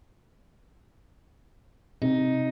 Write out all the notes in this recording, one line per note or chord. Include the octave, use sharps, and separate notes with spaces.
C3 D#4